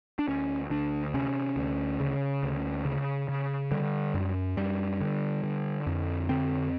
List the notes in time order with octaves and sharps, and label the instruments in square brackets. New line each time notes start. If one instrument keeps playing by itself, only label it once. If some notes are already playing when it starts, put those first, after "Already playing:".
[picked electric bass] D4
D2 C#4
D2 D4
C3 C#4
D2
C#3
D2
C#3
C#3
D3 G3
F#2
F#2 G3
D3
D3
F2
D3 C4